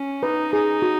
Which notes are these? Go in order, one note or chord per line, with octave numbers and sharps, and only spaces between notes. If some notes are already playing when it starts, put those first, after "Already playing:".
Already playing: C#4
D#4 B4
D#4 G#4
F#4